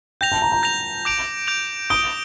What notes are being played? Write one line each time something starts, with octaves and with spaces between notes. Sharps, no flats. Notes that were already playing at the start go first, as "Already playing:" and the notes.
G5 G6 A#6 F7
A5
A#5
A#5
G6 A#6 F7
D6 G6 D7 F7
D6 G6 D7 F7
D6 D#6 G6 D7 G7